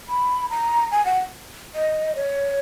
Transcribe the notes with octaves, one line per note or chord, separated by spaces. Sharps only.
B5
A#5
G#5
F#5
D#5
C#5